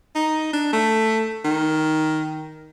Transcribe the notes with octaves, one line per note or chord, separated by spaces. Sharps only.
D#4
D4
A3
D#3